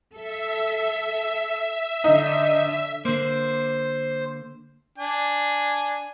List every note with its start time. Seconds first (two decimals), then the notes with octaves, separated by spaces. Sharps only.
0.15 A4 E5
2.04 D3 D4 D#4
3.05 D3 A#3 C5
4.98 D4 G#5